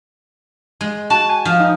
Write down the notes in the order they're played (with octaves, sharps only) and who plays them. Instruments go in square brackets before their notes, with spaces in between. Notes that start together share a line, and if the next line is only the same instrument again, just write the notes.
[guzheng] G#3
[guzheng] F#4 [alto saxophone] A5
[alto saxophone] G#5
[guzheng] F3
[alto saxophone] D#4